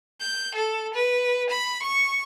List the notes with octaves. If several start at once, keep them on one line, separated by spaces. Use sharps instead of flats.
G6
A4
B4
B5
C#6